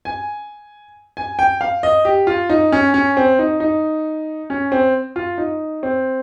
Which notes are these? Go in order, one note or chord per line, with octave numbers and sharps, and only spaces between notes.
G#5
G#5
G5
F5
D#5
G4
F4
D#4
C#4
C#4
C4
D#4
D#4
C#4
C4
F4
D#4
C4